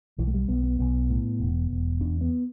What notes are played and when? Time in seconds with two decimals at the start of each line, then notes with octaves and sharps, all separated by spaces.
0.18 B1 E3
0.27 A3
0.34 G3
0.48 B1 B3
0.64 B3
0.79 B1 B3
1.10 A2
1.40 E1
1.71 E1
2.01 E2 D4
2.21 B3